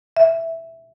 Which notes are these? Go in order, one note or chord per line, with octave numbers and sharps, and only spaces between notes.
E5